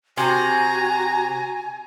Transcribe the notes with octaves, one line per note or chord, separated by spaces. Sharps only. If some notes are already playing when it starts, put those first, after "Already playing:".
C3 F#4 G#5 A#5